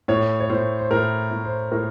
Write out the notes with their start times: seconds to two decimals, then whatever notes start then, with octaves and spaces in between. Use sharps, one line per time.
0.08 A2 C#5
0.40 C#5
0.50 A2 C5
0.79 C5
0.91 A2 A#4
1.31 A2
1.45 C5
1.71 A2 A#4